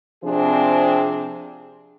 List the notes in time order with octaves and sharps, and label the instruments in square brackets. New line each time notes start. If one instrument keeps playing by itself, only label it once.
[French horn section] C3 F3 C4 D4 G#4